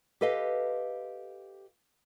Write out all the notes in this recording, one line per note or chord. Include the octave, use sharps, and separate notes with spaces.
G4 A4 B4 D#5 F5